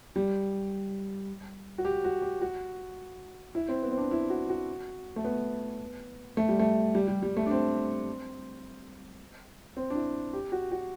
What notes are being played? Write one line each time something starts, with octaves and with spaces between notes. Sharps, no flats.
G3
F#4
G4
F#4
G4
F#4
E4
C4
B3
C4
D4
E4
F#4
F#4
A3
B3
A3
G3
A3
G3
G3
G3
A3
D4
C4
C4
D4
E4
G4
F#4
F#4